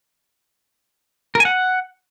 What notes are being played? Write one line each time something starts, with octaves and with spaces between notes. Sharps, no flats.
A#4
G#5
F#5